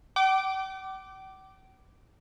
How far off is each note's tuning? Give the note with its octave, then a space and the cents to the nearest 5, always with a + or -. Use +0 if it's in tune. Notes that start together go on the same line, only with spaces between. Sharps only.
G5 -45 D6 +0